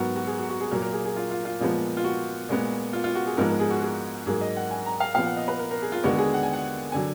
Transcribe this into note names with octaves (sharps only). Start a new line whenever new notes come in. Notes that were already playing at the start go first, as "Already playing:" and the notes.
Already playing: G#2 F#3 B3 F#4 A#4
F#4
G#4
F#4
F#4
G#4
A#2 F#3 A#3 A#4
A#4
G#4
G#4
F4
F4
F4
A#2 F3 G#3 B3
F4
F#4
A#2 G#3 B3
F4
F4
F#4
G#4
G#2 F3 G#3 B3 A#4
A#4
G#4
F#4
G#4
G#2 F#3 A#3 G#4
D#5
F#5
G#5
A#5
F5
A#2 F3 B3 F5
F#5
D#5
B4
A#4
A#4
G#4
F4
D#2 D3 G#3 B3 F#4
G#4
F#5
G#5
F#5
D3 F#3 G#5